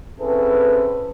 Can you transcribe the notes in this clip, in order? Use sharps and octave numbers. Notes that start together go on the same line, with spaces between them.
C4 C#4 E4 G#4 A4 B4